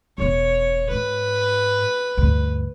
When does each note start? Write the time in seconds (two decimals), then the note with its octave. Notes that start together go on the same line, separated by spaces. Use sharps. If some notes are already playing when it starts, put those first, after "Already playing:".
0.18 E1 B2 C#5
0.90 G#2 B4
2.17 D2 G2